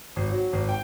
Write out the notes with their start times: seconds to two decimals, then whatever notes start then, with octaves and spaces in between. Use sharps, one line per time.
0.16 G#1
0.30 F#3
0.53 G#1
0.69 G5